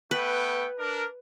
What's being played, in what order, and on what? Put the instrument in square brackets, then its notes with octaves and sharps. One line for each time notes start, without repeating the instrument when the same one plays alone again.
[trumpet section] A3 B3 G5 [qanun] B4
[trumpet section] D4 A#4